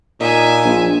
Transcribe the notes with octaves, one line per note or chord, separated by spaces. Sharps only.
A#2 D#4 E5 G#5
A#1